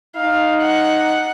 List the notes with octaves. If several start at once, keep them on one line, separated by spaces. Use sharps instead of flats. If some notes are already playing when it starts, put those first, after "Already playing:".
D#4 F5
F#5